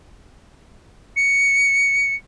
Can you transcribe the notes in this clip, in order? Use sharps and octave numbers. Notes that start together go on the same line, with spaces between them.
C#7